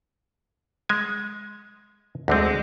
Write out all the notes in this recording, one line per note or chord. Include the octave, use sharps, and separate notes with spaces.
G#3 G#5
D2 D3 G#3 C4